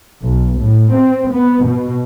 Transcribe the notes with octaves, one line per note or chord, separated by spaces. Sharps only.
B1
A2
C4
B3
B2